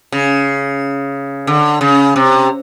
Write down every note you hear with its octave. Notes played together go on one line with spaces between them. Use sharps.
C#3
D3
C#3
C3